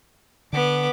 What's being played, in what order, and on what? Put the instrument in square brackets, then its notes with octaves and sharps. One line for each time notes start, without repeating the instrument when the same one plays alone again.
[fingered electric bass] D3 [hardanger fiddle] B3 D6